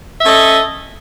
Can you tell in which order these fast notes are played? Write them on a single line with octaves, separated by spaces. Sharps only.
E5 A4 C#4 D#5